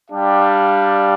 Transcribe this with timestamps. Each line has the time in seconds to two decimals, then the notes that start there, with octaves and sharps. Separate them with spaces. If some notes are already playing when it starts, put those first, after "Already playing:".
0.11 G3 D4 G4 F5